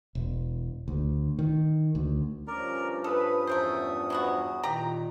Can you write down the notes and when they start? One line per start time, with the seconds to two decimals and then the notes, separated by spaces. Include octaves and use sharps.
0.15 E1
0.88 D2
1.39 D#3
1.95 D2
2.47 G2 F3 C#4 A#4 D5 A#5
3.04 A4 B4 D#6
3.47 E2 A3 A#4 C5
4.10 F#3 B3 F#4
4.63 A#2 D#3 G4 A#5